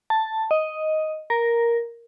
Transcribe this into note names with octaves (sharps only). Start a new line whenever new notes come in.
A5
D#5
A#4